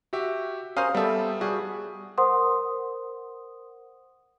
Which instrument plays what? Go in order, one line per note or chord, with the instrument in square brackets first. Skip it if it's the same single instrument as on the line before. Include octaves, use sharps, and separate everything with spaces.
[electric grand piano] F#4 G4 E5
[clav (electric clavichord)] C#4 A#4 C5 [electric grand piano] F5 D#6 D#7
[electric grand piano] G3 E5 [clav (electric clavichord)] B3 A4
[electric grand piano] G3 G#4 [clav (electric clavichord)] F#4
[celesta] A#4 C5 F#5 C6 D#6